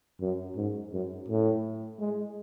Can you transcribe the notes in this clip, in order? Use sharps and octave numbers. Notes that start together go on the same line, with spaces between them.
F#2
G#2
F#2
A2
G#3